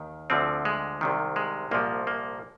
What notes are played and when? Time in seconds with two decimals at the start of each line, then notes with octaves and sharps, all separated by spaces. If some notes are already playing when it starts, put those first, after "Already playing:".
Already playing: D#2 D#3
0.30 D2 D3 F3 C4
0.65 G#3
1.01 C2 C3 D#3
1.36 G#3
1.71 C2 A#2 F3 A#3
2.07 A#3